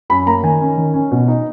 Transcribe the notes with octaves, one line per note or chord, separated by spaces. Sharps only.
F#2 B5
A#3 A#5
D#3 G#5
C#4
D#3
C#4
B2
D#4